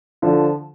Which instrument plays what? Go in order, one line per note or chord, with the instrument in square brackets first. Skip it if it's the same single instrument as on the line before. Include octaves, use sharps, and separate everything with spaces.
[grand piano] D3 F3